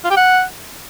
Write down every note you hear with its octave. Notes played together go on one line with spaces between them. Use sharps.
F4
G4
F#5